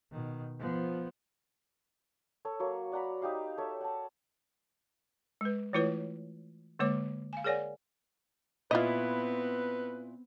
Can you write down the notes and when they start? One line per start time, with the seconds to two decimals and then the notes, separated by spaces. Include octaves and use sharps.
0.12 B2 D#3
0.60 F3 B3
2.45 A4 C#5
2.60 F#3 A#3 C#5
2.92 D5 F#5 A#5 B5
3.22 D#4 G4 F5
3.58 A4 C#5 E5
3.81 F#5 A5
5.41 G#3 B4
5.73 E3 A3 E4 F4 B4 C#5
6.79 D3 G#3 A#3 C#5 D6
7.33 F5 G#5
7.44 G#4 A#4 C#5 D5 F#5 G#5
8.71 A#2 B3 C4 E4 F4 B4 D#5